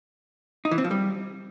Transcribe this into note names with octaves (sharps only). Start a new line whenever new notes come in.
D#4
E3
C4
F3
G3